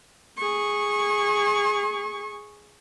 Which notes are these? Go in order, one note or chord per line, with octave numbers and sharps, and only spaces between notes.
G#4 C#6